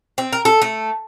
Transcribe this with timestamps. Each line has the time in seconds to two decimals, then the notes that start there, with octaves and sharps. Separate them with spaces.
0.18 C4
0.33 A#4
0.45 A4
0.62 A3